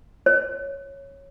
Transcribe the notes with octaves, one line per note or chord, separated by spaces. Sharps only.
C#5